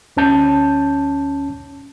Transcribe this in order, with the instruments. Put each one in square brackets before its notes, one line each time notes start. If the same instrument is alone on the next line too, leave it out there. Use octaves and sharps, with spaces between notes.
[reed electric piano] D2 C#4 A5 G6